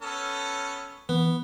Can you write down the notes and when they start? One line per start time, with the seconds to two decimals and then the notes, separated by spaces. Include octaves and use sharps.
0.02 B3 C#4 A4
1.09 E3 B3